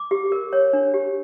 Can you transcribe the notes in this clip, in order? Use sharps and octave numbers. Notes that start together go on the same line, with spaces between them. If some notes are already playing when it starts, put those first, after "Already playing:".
Already playing: D6
G4
A#4
C#5
D4
G4